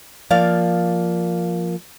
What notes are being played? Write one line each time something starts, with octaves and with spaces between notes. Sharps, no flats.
F3 A#3 D5 F5